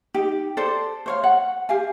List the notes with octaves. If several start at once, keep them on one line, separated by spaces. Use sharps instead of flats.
D#4 G4
A4 C5 D5
C5 C#5 F5
F#5
G4 F5 G#5